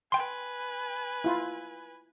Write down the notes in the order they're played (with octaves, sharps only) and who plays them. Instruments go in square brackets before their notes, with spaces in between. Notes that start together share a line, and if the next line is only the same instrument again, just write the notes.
[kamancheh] B4 G#5 [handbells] G5 C6
[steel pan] E4 F4